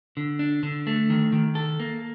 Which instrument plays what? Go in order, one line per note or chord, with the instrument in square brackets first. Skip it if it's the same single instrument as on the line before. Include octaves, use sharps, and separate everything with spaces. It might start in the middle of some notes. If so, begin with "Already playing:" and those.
[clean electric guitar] D3
D4
D3
A3
D#3
D#3
A4
A#3